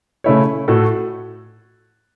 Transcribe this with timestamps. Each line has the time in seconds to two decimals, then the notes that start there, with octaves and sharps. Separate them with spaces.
0.24 C#3 A3 E4 C#5
0.68 A2 A3 F#4 A4